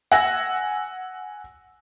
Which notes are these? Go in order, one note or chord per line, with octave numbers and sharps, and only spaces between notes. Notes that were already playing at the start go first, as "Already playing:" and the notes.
F#5 G#5 E6 A#6